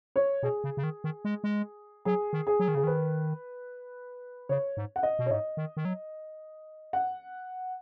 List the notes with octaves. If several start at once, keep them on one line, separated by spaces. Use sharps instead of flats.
C#5
B2 G#4
C#3
C#3
D#3
D#3
G#3
G#3
F#3 G#4
D#3
G#4
F#3
D#3
C#3 G#4
D#3 B4
C#3 C#5
G#2
F#5
D#5
B2
C#5
G#2 D#5
D#3
D#3
F#3
F#5